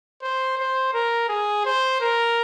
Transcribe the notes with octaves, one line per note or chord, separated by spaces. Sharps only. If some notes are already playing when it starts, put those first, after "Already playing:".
C5
C5
A#4
G#4
C5
A#4